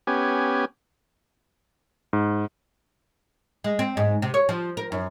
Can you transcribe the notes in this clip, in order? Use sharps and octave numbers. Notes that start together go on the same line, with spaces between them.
B3 C#4 G4 G#5
G#2
G#3
C4
G#2
C3
C#5
F3
A#4
F#2